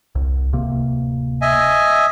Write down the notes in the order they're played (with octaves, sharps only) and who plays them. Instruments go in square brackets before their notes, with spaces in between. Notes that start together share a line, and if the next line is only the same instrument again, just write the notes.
[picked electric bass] C2
D1 C3 A#3
[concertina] D#5 E5 G#5